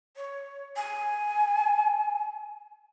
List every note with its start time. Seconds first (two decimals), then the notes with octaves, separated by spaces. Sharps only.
0.16 C#5
0.77 G#5